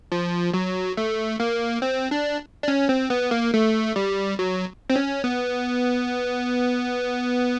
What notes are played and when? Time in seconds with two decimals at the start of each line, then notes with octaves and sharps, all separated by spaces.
0.12 F3
0.54 F#3
0.97 A3
1.40 A#3
1.82 C4
2.11 D4
2.63 D4
2.68 C#4
2.89 C4
3.10 B3
3.31 A#3
3.54 A3
3.96 G3
4.39 F#3
4.90 C4
4.96 C#4
5.24 B3